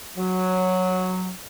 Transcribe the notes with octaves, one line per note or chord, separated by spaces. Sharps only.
F#3